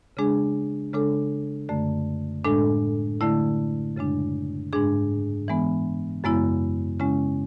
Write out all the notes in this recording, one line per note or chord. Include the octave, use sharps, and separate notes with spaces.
C#3 G#3 D4 G#4
C#3 G#3 D4 A4
F#2 D3 A3
A2 G#3 D4 A4
D3 A3 E4
F#2 C#3 G#3 D4
G#2 G#3 D4 G#4
E3 G#3 B3
F#2 C#3 G#3 B3 E4
C#3 G#3 C#4 E4